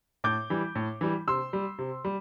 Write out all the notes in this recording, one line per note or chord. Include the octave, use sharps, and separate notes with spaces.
A2 D6 G6
E3 G3
A2
E3 G3
C3 C6 E6
G3
C3
G3